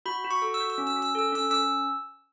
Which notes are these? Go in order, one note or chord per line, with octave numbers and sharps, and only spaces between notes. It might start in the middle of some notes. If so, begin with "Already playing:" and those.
F#4 B5
F#4
C#6
A4
E6
F#4
E6
C#4
E6
C#4
E6
A4 E6
C#4 E6
C#4 E6